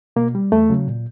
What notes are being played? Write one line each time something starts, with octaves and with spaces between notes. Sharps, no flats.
B2 A#3
G3
E2 A3
C#3 F#3
A#2